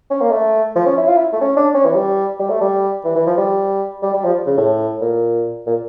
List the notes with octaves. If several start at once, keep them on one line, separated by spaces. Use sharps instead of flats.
C#4
A#3
A3
F3
C#4
E4
F4
E4
A3
C#4
D4
C#4
E3
G3
G3
A3
G3
E3
E3
F3
G3
G3
G3
F3
C#3
A2
A#2
A#2